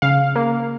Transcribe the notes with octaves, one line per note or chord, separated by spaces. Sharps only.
C#3 F5
A#3